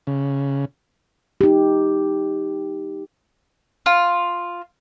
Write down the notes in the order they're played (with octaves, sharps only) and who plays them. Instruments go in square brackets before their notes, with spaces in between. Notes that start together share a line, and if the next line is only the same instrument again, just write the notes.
[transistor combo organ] C#3
[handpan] D#4 G4
[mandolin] F4